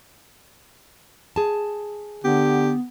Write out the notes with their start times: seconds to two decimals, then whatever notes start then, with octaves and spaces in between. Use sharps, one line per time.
1.36 G#4 A5
2.24 D3 B3 G4